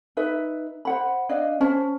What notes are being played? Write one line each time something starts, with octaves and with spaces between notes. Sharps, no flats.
D#4 B4 E5
C5 F#5 B5
D4 D5 D#5 F5
C#4 C5 A5